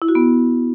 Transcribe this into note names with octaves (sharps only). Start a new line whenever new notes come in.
E4
F#4
B3